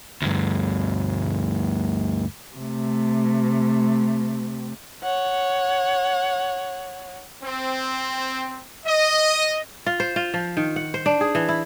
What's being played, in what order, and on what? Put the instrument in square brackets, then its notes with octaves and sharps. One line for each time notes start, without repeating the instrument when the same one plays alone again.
[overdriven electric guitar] D2 G2
[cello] C3 A3
[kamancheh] C#5 F#5
[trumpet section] C4
D#5
[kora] F4
C5
F4
F3
D#3
F#5
C5
D4
G#4
E3
E4